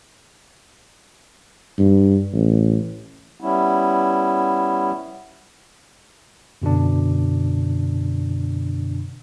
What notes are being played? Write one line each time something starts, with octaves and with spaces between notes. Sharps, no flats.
G2
A1
G3 B3 C#4 E4
F#2 B2 D3 D4